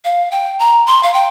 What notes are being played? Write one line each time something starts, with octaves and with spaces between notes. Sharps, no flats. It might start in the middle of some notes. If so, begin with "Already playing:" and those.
F5
G5
A#5
C6
F5
G5